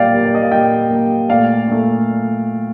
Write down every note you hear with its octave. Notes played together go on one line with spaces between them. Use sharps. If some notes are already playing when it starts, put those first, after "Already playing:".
Already playing: A#2 G3 A#3 D5 F5 G5
A#2 G3 A#3
D5
D#5
F5
A#2 G3 A#3 D#5 G5
A#2 G3 A#3
A#2 A3 D5 F5
A#2 A3